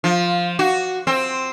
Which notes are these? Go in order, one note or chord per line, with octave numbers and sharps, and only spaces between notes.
F3
F#4
C4